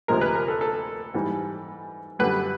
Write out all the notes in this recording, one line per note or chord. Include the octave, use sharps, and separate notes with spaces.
D2 C3 F3 G#3 A#4
B4
A#4
A4
A4
G#2 E3 G3
F#2 D3 G3 B4